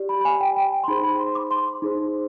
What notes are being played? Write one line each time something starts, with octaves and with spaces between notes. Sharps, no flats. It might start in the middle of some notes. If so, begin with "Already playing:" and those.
Already playing: G4 D5
B5
B5
G#5
G5
G5
G#5
C6
D#4 G#4 C5 B5
B5
C6
D6
C6
D#4 G#4 C5